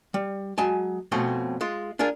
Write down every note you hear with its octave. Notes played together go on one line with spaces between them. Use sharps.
G3
F#3 G#3 G#5 A5
F2 B2 A3 C4 C#4
G#3 F4
D4 F4 G#4 A#4